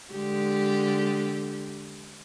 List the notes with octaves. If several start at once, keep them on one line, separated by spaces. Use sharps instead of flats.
D3 G#3 G4